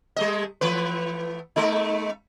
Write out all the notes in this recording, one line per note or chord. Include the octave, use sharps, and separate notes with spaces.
G3 A3 D#5
E3 A3 B4
G#3 A3 D#4